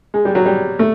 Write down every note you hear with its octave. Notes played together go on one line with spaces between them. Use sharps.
G#3
G3
F#3
G3
A3